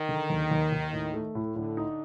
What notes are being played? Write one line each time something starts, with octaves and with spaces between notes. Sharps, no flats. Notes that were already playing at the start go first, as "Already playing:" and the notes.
Already playing: D#3
D3
D#2
D#2
D#2
A2
A3
A2
A2 D3
D#4